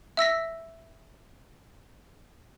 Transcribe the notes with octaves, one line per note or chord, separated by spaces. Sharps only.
E5 E6 A#6 B6